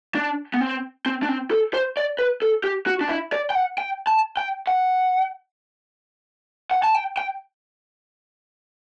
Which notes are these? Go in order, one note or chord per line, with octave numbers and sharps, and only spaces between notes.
D4
B3
C4
C4
D4
C4
A4
C5
D5
B4
A4
G4
F#4
D4
E4
D5
G5
F#5
G5
A5
G5
F#5
F#5
A5
G5
G5